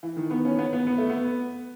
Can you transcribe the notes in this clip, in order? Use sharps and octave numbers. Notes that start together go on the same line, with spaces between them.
E3
D#3
B3
C#4
B3
B3
B3
A3
B3